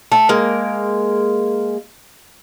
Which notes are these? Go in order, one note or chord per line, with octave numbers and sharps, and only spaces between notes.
A3
G#3 A#3